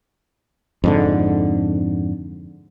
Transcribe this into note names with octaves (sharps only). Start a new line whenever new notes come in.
F2 G#2 D3